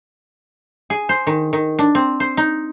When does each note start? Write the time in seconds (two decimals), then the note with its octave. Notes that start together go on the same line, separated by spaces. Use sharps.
0.90 G#4
1.09 C5
1.27 D#3
1.53 D#3
1.79 D4
1.95 C4
2.20 C5
2.37 D#4